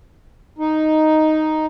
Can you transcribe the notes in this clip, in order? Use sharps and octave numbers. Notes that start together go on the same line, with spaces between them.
D#4